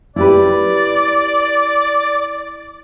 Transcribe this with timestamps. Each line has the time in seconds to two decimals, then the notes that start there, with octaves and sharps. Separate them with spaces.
0.16 E4 G4 B4 D5